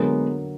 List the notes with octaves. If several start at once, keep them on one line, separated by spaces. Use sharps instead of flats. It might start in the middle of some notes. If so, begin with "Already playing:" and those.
Already playing: D3 F#3 G#3 A#3 B3